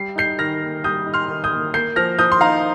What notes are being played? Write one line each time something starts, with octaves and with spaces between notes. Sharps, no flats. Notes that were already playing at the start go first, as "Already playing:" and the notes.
Already playing: G3 C7
D#4 G6 C7
D#3 F6 A#6
A#3
G3 D#6 G6
D#4
C6 F6
D#3
D#6 G6
A#3
A#3 G6 C7
F3 F6 A#6
F3 D#6 G6
C6
D#4 F5 A#5